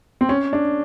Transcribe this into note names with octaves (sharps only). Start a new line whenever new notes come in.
C4
C#4
D4